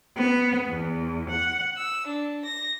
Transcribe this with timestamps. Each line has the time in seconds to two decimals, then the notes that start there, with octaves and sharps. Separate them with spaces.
0.16 B3
0.68 E2
1.29 F#5
1.76 E6
2.06 D4
2.43 A#6